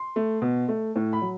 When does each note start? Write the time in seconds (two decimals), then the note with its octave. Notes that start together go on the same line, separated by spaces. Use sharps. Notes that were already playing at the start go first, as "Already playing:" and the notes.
Already playing: C6
0.16 A3
0.42 B2
0.69 A3
0.96 A2
1.13 B5
1.22 F#3